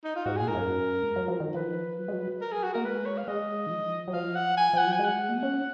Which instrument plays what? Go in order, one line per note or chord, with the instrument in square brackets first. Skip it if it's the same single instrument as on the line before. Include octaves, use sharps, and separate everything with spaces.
[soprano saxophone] D#4
F4
[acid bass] G#2 [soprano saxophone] F#4
[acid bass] A#2 [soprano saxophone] G#4
[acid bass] G#2 [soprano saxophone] A#4
[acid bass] F#2
G#3
F#3
F3
D#3
[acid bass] F3 [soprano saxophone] B4
[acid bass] F#3
G#3
F#3
[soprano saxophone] A#4
G#4
F#4
[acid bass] A#3 [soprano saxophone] A#4
[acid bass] G#3 [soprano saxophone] B4
[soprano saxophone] C#5
F5
[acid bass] G#3 [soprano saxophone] D#5
[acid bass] D#3
F3
F#3
[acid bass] F3 [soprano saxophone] F5
[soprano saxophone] F#5
G#5
[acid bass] F3 [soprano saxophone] F#5
[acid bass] F#3
[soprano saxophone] G#5
[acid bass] G#3
[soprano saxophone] F#5
[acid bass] A#3
B3
C#4